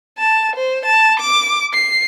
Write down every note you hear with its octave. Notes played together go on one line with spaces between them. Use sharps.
A5
C5
A5
D6
C7